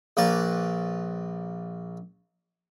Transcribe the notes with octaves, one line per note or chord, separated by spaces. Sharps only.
A#1 A#3 B4 D5